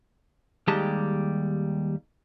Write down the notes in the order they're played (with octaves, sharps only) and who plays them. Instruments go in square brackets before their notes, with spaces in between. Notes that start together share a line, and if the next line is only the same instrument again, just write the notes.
[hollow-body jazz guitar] D#2 G3 G#3 G4 A5